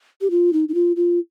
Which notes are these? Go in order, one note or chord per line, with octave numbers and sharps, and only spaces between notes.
G4
F4
D#4
D#4
F4
F4